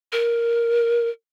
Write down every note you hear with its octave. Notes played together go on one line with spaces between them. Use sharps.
A#4